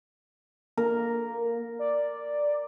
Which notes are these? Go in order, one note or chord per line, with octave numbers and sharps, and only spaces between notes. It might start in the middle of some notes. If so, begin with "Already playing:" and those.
A#3 A#4
D5